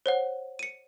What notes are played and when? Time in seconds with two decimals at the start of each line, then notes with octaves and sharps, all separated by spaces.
0.06 C5 C#5 F#5
0.59 C#7 D#7